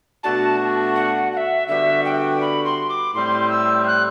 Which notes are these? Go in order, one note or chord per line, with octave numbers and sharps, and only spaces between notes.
B2 A3 D4 F#4 A5
F#5
F#5
E5
D3 G3 B3 F#4 E5
G5
B5
C6
D6
A2 G3 C4 E4 C6
E6
F#6